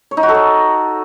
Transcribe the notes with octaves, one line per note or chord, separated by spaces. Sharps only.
C#5
D#4
F#4
A4
C#5